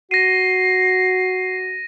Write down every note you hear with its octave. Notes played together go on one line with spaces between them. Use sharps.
F#4 A#6 C7 D#7